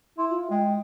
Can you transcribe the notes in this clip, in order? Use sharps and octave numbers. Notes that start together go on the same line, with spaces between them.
E4 C6
F4
G#3 G5